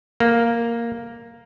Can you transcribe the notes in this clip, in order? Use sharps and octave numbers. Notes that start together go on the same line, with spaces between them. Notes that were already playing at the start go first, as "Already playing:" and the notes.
A#3